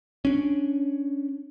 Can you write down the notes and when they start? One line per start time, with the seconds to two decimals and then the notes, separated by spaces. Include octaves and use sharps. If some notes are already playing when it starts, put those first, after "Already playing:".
0.25 C#4 D4